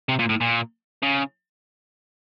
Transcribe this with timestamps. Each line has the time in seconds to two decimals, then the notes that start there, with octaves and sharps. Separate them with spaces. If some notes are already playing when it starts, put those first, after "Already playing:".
0.09 C3
0.19 A#2
0.29 A2
0.41 A#2
1.03 C#3